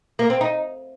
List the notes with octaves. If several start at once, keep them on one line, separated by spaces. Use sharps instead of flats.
A#3
C4
D#4